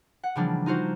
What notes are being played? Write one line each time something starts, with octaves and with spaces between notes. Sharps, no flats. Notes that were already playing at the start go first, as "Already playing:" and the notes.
F#5
C#3 E3 F3 G3 A#3 D4
D#4 F4 F#4 C5